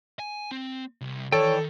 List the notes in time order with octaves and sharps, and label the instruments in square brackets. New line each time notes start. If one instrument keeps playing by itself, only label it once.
[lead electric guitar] G#5
C4
C2
[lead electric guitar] D#3 [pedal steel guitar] E3 D5 G5 [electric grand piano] A4 [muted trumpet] C#5